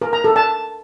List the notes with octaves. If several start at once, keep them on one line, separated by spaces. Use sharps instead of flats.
A#4
A#5
A4
A5